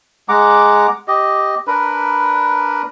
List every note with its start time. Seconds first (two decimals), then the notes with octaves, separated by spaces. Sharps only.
0.29 G#3 F#5 A#5 D6
1.08 G4 D#5
1.67 D4 A#4 B4 B5